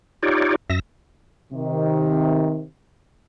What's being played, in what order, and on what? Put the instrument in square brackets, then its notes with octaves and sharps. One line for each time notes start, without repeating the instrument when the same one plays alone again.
[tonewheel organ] D#4 F4 G4 C#5 D5
F#2 E5 A#6
[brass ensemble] C3 D#3